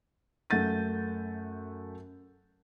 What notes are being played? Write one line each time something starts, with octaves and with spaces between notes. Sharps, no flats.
F#2 A3 F#5 G6 A6 D#7